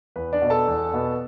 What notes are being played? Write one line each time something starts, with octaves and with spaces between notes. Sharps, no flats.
E2 B4
D4 D5
B2 B3
A4 A5
E2
B2 B3